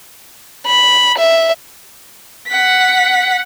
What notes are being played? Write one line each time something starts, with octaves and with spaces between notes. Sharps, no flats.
B5
E5
F#5 B6